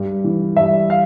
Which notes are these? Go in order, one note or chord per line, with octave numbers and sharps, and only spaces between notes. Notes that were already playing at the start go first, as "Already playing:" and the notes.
Already playing: G2
E3
G2 E5
F5